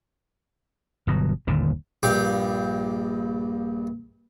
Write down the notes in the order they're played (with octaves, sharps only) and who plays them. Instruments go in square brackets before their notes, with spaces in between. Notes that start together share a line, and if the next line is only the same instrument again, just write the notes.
[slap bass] G1 B2 F#3
G1 D#2 A#2 D3
[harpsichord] A#1 G2 F5 G5 D6